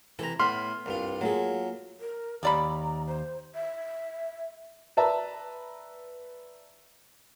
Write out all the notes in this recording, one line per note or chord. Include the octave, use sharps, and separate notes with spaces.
C3 E3 A4 A#5
A2 B3 B5 C6 F6
C2 G2 F4
F#3 A#3 F4 G#4 A4
A#4
D#2 D5 A#5 B5
C5
E5
B4 D5 E5 A5 A#5